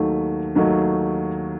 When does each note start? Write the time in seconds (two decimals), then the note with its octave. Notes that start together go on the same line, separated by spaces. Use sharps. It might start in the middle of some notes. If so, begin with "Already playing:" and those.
Already playing: D#2 D#3 F#3 A3
0.55 D#2 D#3 F#3 A3